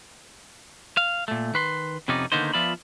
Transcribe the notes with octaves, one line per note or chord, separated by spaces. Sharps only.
F5
A#2 A3
D#3 B4 C6
F2 C3 B3 C#4 D#4 D5
D3 D#3 A#3 B3 D#4 C5
F3 B3 F4 D5 E5 B5